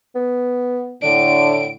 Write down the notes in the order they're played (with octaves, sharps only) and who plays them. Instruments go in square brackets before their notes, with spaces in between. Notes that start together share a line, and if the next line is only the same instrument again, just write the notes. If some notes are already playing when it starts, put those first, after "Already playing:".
[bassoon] B3
[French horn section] A2 D3 [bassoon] D4 [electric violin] D7